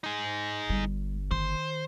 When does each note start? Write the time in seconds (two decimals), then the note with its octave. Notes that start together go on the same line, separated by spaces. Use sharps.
0.04 D#4 G#4
0.70 G1 G3
1.31 D#3 C5